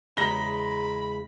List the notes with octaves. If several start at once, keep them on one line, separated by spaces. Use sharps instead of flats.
E2 C#3 G#3 A#5 B5 A#6 G7